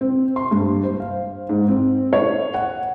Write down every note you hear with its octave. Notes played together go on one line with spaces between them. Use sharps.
C4
C6
G2
C5
F5
G#2
C4
C#5
F#5